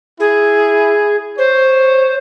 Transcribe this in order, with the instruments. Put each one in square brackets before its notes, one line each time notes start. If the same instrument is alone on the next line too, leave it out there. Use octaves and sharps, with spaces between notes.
[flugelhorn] E4 [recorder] G#4
[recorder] C5 [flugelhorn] C#5